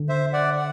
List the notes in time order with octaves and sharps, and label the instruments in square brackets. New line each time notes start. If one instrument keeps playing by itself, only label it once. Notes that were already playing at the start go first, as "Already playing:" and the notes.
Already playing: [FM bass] D3
[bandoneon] C5 E5
D5 F#5
F#5